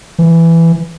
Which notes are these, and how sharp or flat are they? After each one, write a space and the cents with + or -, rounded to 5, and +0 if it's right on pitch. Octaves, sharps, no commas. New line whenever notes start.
E3 +10